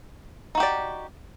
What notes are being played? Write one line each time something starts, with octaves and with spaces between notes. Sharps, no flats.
D#4 F#4 G4 D5